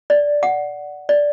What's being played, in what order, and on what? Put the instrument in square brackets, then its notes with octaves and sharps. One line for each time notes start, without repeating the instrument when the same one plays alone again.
[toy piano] D5
F#5
D5